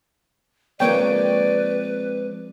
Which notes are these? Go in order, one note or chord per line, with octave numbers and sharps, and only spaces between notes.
F3 G#3 A#3 C4 B4 C#5 D5 G5